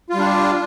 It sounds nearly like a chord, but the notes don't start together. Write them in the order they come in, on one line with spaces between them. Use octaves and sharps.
F4 G3 D4